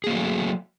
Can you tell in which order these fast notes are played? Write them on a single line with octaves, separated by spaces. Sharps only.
G#4 A#3 F#4 A3 F#3